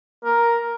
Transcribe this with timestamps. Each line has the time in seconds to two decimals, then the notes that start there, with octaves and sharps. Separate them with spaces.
0.25 A#4